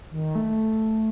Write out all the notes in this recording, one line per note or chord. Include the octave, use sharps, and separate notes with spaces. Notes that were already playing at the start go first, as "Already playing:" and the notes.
D#3
A3